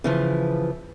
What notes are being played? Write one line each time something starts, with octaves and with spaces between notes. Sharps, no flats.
C#3 E3 F3